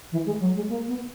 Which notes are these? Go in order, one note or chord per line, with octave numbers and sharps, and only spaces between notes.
E3
G#3
F#3
G#3
A#3
B3